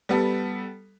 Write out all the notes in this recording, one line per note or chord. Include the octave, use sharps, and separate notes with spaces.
G3 B3 A4